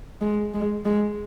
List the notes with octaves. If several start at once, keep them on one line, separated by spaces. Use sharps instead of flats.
G#3
G#3
G#3